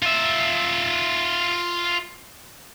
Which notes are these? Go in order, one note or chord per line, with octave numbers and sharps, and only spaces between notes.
F4 E5